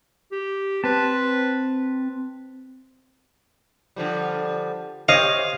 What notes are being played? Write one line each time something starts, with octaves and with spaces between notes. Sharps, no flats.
G4
C4 B4 A5
D3 F3 G3
G4 C5 C#5 D#5 F5